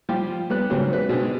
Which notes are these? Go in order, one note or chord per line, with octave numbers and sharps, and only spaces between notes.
F3 G3 F4 G4
G3 B3 F#6
G#2 C#3 F#3 G3 C4
B4
B2 G#3 C4 D4